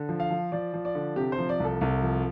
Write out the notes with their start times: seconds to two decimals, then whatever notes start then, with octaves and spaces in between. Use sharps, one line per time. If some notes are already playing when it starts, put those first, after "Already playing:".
Already playing: D3
0.09 F3
0.20 F5
0.31 F3
0.52 F3 D5
0.73 F3
0.85 D5
0.95 D3
1.16 C3 G4
1.32 C5
1.38 F3
1.49 D5
1.60 C2 A4
1.81 C2
2.02 F3